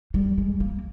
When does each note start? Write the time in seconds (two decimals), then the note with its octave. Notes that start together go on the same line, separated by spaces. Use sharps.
0.14 G3
0.38 G#3
0.60 A#3